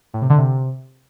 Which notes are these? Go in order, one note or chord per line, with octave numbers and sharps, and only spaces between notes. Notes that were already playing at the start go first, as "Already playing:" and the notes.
A2
C3
D3
C3